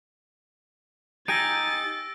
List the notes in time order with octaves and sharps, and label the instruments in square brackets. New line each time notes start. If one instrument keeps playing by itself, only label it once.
[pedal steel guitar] D#4 G4 G#5 [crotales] E6 A#6 D7 [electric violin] A6